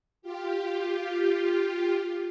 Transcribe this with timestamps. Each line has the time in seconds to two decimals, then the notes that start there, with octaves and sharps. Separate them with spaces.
0.22 F4 G4